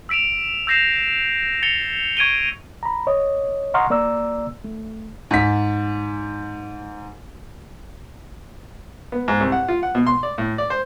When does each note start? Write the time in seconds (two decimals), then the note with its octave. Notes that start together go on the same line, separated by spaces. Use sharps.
0.09 E6 B6 D7 E7 F7
0.67 E6 G6 A#6 C7 E7 F7
1.63 A6 C#7 F7 G7
2.17 C#6 G#6 D7 D#7 G7
2.83 A#5 B5
3.07 C#5 D#5
3.74 D#5 F#5 A#5 C6 C#6 F6
3.90 A#3 D5 A#5 E6
4.64 A3
5.31 G#2 B6
9.12 B3
9.28 G#2
9.41 C2
9.52 F#5
9.68 F4
9.83 F#5
9.95 B2
10.07 C6
10.23 D5
10.38 A2
10.58 D5
10.70 C5